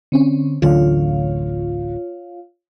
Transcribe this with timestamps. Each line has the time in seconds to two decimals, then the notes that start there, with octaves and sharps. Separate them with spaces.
0.12 D3 C4 C#4
0.62 D1 A1 D3 F4 C#5 F5